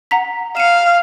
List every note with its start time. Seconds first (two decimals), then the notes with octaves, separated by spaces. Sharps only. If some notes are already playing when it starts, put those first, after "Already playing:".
0.11 F#5 A#5 B6
0.57 F5 C#7 D#7 E7